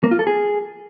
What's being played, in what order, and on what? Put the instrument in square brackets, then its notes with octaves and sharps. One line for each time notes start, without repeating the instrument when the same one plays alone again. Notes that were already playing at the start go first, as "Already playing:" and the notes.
[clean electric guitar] A#3
F4
A4
G#4